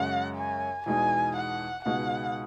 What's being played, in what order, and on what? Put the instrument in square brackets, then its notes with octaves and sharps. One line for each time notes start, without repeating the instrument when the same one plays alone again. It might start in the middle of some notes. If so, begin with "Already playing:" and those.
Already playing: [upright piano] F#2 C#3 G#3 C#4 [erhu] F#5
[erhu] G#5
[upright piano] E2 B2 G#3 D#4 [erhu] G#5
[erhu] F#5
[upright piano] C#2 B2 G#3 D#4 [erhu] F#5